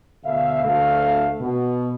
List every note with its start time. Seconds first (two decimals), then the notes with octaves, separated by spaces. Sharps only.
0.24 D2 B2 E5 F5
0.64 D2 A3 F5
1.40 B2